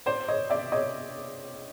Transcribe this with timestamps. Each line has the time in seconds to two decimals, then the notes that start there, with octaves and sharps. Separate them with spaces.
0.06 C5 D5
0.28 C#5 D#5
0.50 D5 E5
0.72 C#5 D#5